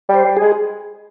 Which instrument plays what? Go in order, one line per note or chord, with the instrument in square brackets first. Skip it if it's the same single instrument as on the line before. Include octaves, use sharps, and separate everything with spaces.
[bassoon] G3
[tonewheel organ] C5
[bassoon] G3
[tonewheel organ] G#4
[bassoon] G#3